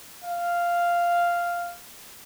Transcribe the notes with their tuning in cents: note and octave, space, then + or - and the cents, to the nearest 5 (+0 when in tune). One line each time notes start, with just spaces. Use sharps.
F5 -5